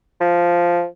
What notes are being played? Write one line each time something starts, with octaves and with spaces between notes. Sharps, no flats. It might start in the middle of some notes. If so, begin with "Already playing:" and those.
F3